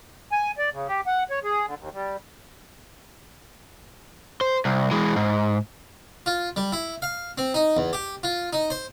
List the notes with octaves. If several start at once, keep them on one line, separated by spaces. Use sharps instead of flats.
G#5
D5
C#3
G4
F#5
C#5
G#4
D3
D#2
G3
C5
C2
E3 G#3
G#2
F4
G3
E4
F5
C4
D#4
E2
G4
F4
D#4
C5